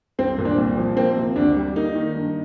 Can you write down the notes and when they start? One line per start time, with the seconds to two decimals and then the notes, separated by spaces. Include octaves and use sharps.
0.18 C2 C4
0.38 A#2
0.45 D4
0.58 C2
0.77 F3
0.97 A#3 C4
1.17 C3
1.36 D2 D4
1.57 G3
1.76 A#3 D#4
1.96 D#3
2.15 G2